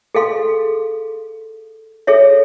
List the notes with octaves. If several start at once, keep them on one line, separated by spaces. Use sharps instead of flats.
G#4 A4 F5 C6
G#4 A4 C#5 E5